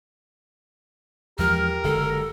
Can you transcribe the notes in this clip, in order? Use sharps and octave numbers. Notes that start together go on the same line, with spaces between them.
E2 F3 G#3 G4 A#4 F6
F#1 D3 G#3 A4